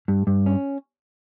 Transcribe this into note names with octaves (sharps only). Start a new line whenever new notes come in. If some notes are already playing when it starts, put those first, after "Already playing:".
G2
G2
C#4